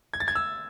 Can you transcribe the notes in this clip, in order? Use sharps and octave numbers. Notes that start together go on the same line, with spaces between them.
G#6
A6
G#6
E6